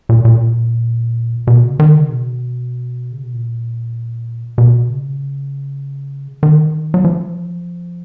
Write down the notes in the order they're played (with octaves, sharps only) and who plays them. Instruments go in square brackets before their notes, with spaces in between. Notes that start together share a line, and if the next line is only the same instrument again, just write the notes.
[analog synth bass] A#2
A#2
B2
C#3
D#3
C#3
B2
C#3
B2
A#2
B2
A#2
B2
C#3
D#3
F#3
F3